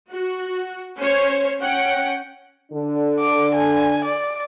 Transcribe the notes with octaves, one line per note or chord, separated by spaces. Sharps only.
F#4
C#4 C5 C#5
C#4 F#5 G5
D3 D4
D6
G#5
D5